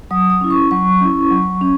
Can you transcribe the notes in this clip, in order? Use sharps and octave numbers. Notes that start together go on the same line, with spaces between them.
F#3 D#6
D#6
C#4 E4
C#6
F#3 C#6
C#4 E4
F#3
C#4